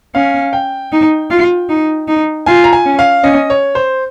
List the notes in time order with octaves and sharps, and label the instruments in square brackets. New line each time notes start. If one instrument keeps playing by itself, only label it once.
[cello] C#4 [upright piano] F5
[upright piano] G5
[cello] D#4
F4
D#4
D#4
[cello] F4 [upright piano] G#5
[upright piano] A#5
G#5
[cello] C#4
[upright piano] F5
[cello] C#4 [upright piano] D#5
[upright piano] C#5
C5